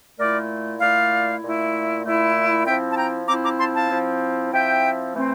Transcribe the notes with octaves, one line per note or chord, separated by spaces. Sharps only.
A#2 A3 E4 A#4 D5
A#2 A3 E4 D5 F5
A#2 A3 E4
A#2 A3 E4
F3 C4 E4 E5 G5
A5
G5 A#5
F3 C4 E4 A#5 D6
A#5 D6
A5 C6
F5 A5
F3 C4 E4
F3 C4 E4 E5 G5
E3 A3 C4